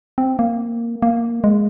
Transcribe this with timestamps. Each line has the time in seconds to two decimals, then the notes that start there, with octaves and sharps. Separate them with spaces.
0.18 C4
0.39 A#3
1.02 A#3
1.44 G#3